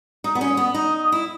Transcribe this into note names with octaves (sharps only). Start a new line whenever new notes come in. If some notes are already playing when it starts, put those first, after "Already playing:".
D#4 D#6
B3
C#4
B3
D#4 D#6
E4